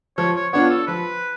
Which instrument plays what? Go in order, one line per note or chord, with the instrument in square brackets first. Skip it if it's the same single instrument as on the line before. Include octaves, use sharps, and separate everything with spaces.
[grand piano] F3 [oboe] C#5
[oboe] C#5
[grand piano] B3 D4 F4 [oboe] C#5
[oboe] A4
[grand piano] F3 [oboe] B4